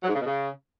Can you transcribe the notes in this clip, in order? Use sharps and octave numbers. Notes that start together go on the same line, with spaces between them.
F#3
G#2
C#3
B2
C#3